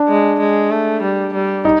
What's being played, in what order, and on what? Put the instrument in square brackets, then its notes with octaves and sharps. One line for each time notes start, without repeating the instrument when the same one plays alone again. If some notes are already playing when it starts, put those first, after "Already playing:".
Already playing: [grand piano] D4
[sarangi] G#3
G#3
A3
G3
G3
[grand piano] D#4